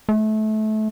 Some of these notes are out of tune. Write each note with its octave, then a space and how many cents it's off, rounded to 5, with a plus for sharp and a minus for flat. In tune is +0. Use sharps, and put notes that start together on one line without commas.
A3 -25